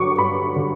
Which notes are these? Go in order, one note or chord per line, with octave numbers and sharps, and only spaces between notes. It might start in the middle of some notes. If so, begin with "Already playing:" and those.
Already playing: G2 D3 F#3 C#6 D6
G2 B5
D3 F#3